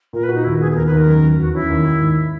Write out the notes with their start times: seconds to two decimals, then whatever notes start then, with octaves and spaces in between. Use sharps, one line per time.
0.13 A#2 A#4
0.23 B4
0.29 F#4
0.34 D#4
0.44 D#2 E4
0.60 B3 G#4
0.71 G#4
0.76 D#2 A#4
0.87 B4
0.91 D#2
0.97 A#4
1.07 F#2
1.23 F#2
1.38 E2 F#4
1.54 C#4 E4
1.70 D#2
1.86 D#2
2.01 G#2